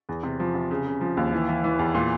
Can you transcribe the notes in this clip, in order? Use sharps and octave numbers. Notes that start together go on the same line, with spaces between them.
E2
C3
F3
C3
C#3
C#3
F3
D#2
E3
E3
E3
E2
A#2